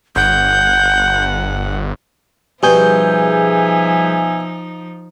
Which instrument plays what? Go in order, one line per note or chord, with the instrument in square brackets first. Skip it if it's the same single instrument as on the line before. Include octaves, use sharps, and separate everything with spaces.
[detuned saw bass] G1 [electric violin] F#5 [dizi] G6
[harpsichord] B2 [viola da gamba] F3 D#4 [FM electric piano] G3 G#4 G6 [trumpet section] E5 G#5